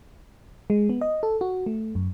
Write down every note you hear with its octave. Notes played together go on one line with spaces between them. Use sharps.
G#3
B3
D#5
A4
F#4
A3
F#2